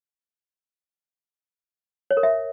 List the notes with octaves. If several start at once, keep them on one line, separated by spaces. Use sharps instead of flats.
C#5
A#4
E5